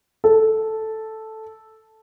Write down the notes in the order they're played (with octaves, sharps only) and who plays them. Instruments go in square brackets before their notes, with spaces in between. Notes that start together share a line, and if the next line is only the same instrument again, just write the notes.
[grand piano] A4